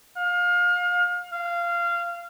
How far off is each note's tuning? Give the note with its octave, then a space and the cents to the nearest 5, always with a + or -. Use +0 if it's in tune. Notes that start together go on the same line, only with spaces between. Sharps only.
F5 +30
F5 -20